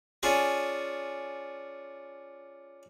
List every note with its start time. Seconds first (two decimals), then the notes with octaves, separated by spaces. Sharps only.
0.23 C#4 D4 F4 G#4